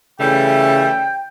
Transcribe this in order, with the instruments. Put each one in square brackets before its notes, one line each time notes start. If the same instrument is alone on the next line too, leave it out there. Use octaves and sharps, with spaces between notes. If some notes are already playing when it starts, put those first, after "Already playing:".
[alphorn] C#3 [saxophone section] E3 G3 A3 [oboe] G5